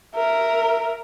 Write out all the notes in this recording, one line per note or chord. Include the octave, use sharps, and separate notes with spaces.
A#4 E5